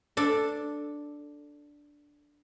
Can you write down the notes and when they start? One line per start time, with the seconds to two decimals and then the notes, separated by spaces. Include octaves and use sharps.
0.17 D4 A4